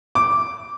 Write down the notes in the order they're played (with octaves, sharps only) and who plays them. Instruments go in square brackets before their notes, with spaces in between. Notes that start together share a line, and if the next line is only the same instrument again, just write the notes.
[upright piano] D6